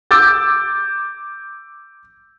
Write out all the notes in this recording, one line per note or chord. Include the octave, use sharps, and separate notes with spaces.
D6 E6 G6 A6